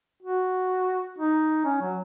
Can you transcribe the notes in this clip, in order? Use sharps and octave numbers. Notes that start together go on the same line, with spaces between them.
F#4
D#4
C#4
F#3